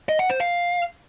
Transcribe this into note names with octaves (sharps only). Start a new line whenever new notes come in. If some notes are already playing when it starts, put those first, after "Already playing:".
D#5
F#5
C5
F5